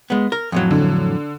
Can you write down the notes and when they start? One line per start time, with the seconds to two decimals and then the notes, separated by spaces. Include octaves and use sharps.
0.10 G#3 B3
0.32 A#4
0.52 F2 A2 F#3
0.71 D3